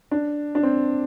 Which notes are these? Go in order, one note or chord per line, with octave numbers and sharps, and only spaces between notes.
D4
D4
C4